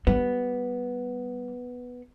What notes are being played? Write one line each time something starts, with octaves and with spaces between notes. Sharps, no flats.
G3 B3